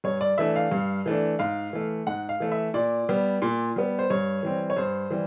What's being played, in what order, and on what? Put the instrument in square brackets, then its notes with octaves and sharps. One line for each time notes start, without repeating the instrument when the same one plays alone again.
[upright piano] G2 C#5
D5
E3 A3 D4 E5
F5
G2
E3 A3 D4
G#2 F5
E3 A3
G#2 F#5
F5
E3 A3
E5
A#2 D5
G3 B3
A#2
G3 B3
C5
G2 C#5
E3 G3 C4
C#5
G2 C5
E3 G3